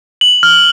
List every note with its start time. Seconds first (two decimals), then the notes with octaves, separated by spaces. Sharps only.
0.21 F#7
0.43 F6